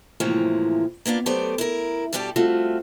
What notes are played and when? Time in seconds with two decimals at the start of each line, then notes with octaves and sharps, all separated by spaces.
0.20 A2 C3 E3 F3 G#3 A#3
1.06 A#3 B3 D4 F4
1.26 F#3 A3 B3 G4 C5 D5
1.58 E4 A#4
2.13 G2 B2 G3 G4 D5 A5
2.36 G3 A3 C4 F4 F#4